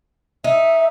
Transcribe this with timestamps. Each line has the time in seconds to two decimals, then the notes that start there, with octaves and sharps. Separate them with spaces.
0.44 D#4 E5